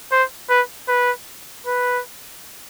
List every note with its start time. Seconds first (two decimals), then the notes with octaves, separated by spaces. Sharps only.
0.12 C5
0.50 B4
0.88 B4
1.66 B4